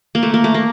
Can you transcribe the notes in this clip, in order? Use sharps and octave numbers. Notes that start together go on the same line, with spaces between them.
A#3
A3
A#3
A3
A#3